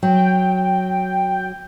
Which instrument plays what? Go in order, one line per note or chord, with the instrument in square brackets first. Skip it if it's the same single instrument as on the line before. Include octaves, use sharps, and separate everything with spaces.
[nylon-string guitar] F#3 [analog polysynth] G5